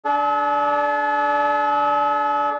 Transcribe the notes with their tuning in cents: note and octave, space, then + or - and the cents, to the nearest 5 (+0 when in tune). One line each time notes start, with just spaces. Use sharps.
D4 -5 A4 -45